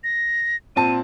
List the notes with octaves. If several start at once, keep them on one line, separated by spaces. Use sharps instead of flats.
A#6
A#2 C4 A5 D#7